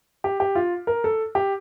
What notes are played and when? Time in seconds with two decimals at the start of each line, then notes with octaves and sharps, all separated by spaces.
0.24 G4
0.40 G4
0.55 F4
0.87 A#4
1.04 A4
1.35 G4